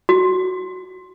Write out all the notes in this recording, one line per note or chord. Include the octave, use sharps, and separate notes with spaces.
F#4